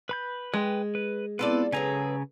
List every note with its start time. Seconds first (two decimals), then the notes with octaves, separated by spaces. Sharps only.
0.09 B4 B5 G6
0.54 G#3 B4 G5
0.95 B4
1.39 B3 C4 E4 F4 A4 B4 D5
1.72 C#3 F#3 G#4 A4 B4 G#5 A#5